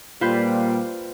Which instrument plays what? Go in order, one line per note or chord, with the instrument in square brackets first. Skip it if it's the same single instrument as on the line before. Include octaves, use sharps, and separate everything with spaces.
[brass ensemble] A#2 G3 [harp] F4 B4 C5